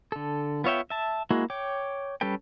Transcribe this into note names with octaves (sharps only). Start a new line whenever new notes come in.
D3 A4
B3 F4 C#5 E5 G5
E5 A5
G#3 A#3 E4 F#4
C#5 G5 D6
G3 C#4 A4 B4 G5